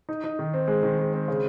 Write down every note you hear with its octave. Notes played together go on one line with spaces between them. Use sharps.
D#4
D#4
D#3
C4
G#3
D#3
G#3
C4
C#3